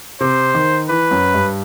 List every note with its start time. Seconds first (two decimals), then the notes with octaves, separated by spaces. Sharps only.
0.20 C3 C5
0.55 D#3
0.89 E3 B4
1.11 F#2
1.34 G2